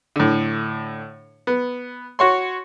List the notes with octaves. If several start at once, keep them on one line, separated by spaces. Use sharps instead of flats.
A2 D3
B3
F#4 C#5 C6